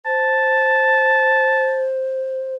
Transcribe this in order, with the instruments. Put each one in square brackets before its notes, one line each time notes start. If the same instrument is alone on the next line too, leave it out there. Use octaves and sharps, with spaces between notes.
[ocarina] C5 [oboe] A5